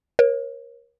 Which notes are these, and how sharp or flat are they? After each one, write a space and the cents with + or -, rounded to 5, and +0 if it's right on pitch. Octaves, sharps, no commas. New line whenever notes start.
A#4 +30 C#5 -30